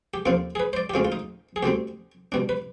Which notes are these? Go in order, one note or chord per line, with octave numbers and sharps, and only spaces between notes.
G4
D#2 D3 F3 C4 F4
G#4
B4
C5
D5
G4
D2 D3 G#3 C4 F4
F4
D#4
G#4
D2 D3 G3 C4 G4
B2 G3 D4
B4